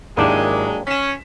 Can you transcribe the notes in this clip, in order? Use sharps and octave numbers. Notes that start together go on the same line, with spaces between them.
G#1 D#3 F#3 G#3 A#3 D4 E4 G4
C#4 B6 E7